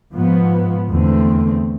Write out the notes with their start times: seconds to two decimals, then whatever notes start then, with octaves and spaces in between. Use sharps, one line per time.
0.14 G#2 F3 B3
0.89 E2 D3 A3 C4